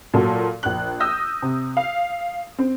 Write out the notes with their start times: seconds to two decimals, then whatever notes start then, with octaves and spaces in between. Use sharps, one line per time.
0.14 A#2 F#3 A4
0.63 A#1 F#6
1.00 D#6 E6 G6 A#6
1.42 C3
1.77 F5
2.58 C4